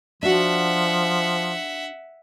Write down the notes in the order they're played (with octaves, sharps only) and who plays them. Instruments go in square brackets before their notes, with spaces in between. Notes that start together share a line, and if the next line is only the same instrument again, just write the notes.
[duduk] F3 [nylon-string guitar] D4 F#4 [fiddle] E5 F#5